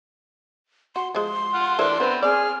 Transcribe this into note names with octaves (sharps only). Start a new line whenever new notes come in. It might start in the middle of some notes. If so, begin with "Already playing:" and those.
F#4 C6
F3 G#3 C6
F4 F#5
E3 D4 A4 A#4 C5 E5
B3 C4 D4 B4
C4 G#4 D5 F6